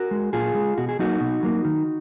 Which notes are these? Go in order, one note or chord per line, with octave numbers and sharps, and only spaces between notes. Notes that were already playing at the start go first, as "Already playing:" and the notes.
Already playing: F#4 A#4
G#3
A#2 F4 G#4
G#3
B2 F#4
G#4
F#3 A#3 D#4 F#4
B2
F#3 A#3
D#3